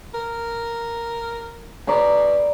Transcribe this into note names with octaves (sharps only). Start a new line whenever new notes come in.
A#4
B2 D5 A#5